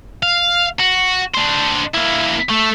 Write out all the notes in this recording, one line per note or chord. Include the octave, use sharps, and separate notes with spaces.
F5
F#4
D4 C5
A#3 E4
A3